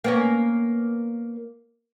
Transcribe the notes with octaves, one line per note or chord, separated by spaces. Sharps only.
A#3 B3 C#4